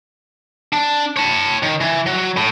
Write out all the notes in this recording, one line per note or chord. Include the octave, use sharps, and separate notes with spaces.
D4
C#5 A5
D#3
E3
F#3
A2